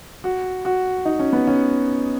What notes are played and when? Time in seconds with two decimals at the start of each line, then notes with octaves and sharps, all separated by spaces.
0.24 F#4
0.65 F#4
1.05 D#4
1.19 C#4
1.33 B3
1.47 C#4